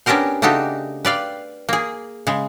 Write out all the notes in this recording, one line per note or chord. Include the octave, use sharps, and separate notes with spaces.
B3 C#4 D4 G4 A#4 C5
C#3 A3 D4 D#4 F#4 G4
B4 D5 F5 G5
A#3 G#4
C#3 G#3